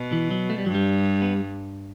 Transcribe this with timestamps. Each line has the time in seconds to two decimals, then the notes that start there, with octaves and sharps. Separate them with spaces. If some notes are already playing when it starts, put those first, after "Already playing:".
Already playing: B2
0.12 E3
0.31 F#3
0.50 A3
0.58 G3
0.66 G2 F#3
0.75 G3
1.22 B3